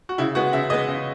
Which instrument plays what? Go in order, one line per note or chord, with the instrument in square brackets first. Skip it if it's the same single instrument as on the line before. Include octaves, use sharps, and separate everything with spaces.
[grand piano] F#4
C#3 E4
G#3 B3 F#4
C#3 E5
G#3 B3 D#5
C#3